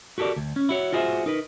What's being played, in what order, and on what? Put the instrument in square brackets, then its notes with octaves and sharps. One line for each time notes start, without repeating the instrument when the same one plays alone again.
[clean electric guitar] F#4 G4 A4 A#4 D5
D2
C#4
E4 F#4 C#5
F4 F#4 G#4 C5 D5 E5
D#4 A#4 B4